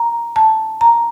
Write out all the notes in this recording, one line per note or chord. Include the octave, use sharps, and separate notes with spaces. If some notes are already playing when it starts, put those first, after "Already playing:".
Already playing: A#5
A5
A#5